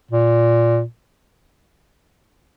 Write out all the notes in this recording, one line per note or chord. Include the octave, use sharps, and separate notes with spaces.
A#2